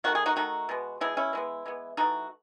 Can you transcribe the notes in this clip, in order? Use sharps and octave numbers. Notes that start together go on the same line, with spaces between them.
D#3 A3 F#4
G#4
D#4 F#4
D#3 A3 D#4 F#4
B2 G#3 B3
B2 G#3 B3 E4 G#4
C#4 E4
E3 G#3 B3
E3 G#3 B3
E3 A3 D#4 F#4